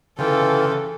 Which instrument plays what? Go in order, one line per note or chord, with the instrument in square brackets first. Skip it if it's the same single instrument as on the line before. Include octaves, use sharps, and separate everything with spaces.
[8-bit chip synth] C#3 [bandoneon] E3 [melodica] F4 G5 [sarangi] A4